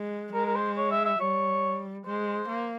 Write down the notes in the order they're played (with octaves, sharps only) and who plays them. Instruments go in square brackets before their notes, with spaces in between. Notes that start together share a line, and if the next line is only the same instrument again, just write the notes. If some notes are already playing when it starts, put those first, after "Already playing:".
Already playing: [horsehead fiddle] G#3
[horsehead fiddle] G#3 [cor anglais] A#4
[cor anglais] A#4
C5
C#5
E5
E5
[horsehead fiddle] G3 [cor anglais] C#5
[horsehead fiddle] G#3 [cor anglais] C5
[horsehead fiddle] A#3